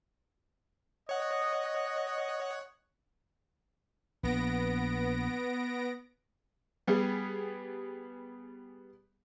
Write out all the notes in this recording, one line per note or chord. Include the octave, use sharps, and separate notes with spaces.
C#5 D#5 F#5
A#1 B3 A#6 D7
G3 B3 G4 G#4